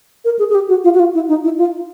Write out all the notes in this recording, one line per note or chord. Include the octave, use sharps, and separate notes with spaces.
A#4
G#4
G#4
G4
F#4
F4
F#4
F4
E4
D#4
E4
F4